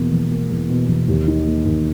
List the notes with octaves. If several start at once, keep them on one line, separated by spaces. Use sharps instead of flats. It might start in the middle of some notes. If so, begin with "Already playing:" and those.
Already playing: E2 B2 A#3
E1
A#3
E2
B2
E1
D#2
D#3
A#3
D#2